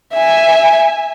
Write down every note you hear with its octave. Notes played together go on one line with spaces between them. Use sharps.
E5 G#5